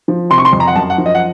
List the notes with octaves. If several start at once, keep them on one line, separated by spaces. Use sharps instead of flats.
F3
C3 C6
C#6
C6
F2
A#5
F#5
F#2 A5
F#5
F3
D#5
F#5